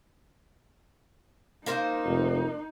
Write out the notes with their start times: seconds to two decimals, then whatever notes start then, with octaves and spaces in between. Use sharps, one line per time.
1.66 A#3 D#4 A#4 C5
2.05 F1